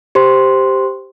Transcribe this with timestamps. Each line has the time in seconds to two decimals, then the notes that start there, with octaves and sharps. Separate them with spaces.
0.15 G4 C5 C6